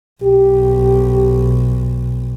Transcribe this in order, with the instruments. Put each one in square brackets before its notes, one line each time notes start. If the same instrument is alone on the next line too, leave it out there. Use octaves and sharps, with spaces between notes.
[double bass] B1 [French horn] G4